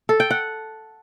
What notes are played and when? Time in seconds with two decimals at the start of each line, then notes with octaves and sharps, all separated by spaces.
0.09 A4
0.20 G5
0.31 F#5